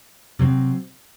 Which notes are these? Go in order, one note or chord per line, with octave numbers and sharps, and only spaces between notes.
C3 F#3 C4